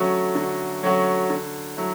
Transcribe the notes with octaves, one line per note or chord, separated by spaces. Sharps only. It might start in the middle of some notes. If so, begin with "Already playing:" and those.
Already playing: D3 F#3 A3 C#4 F#4
D3
F#3 A3 C#4 F#4
D3
F#3 A3 E4